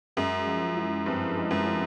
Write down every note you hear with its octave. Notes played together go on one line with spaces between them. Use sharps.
F#2 G#3
F3
E4
G2 C4
G#3
F#2
F3